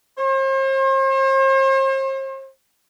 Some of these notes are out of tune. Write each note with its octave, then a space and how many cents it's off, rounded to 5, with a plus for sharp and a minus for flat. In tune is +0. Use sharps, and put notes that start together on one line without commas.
C5 +40